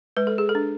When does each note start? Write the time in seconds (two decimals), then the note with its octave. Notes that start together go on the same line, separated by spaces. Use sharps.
0.17 G#3 B4
0.27 A4
0.38 G#4
0.49 A4
0.55 D4